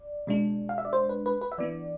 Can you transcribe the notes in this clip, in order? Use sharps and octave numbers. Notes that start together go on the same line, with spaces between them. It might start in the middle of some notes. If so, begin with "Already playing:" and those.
Already playing: D5
B2 G#3 D4
F5
E5
D5
C5
B4
B4
B4
E5
E3 B3 D4 D5